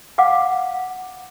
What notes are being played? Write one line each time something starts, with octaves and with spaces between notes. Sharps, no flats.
F5 F#5 D6